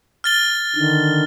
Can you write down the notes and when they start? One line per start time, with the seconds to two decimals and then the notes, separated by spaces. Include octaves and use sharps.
0.24 F6 A6 G7
0.76 D3 D#3